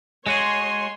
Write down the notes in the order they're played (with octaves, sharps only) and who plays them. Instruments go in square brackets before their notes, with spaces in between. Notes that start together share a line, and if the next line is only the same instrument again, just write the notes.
[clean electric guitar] G#3 F#4 G#4 [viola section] C#5 C6